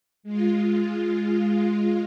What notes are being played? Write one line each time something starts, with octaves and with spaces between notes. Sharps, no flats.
G#3 F4